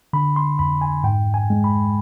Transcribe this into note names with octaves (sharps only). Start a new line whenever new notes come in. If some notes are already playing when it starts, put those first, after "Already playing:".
D3 B5
C6
F2 B5
G#5
G#2 G5
G#5
G#3
B5